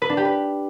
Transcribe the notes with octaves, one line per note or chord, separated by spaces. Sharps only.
B4
D4
G4
B4